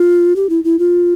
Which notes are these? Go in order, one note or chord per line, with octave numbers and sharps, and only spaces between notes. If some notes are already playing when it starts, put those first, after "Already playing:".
Already playing: F4
G4
E4
E4
F4